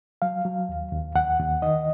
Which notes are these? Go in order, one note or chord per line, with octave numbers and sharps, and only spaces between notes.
F#3 F5
F#3
D#2
D#2
D#2 F#5
D#2
D#3 D#5